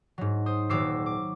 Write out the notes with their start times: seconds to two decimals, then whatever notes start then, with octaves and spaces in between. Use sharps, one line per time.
0.18 G#2 F#3
0.46 C5 D#6
0.69 D#1 F#3 D6 E6 C7
1.06 D6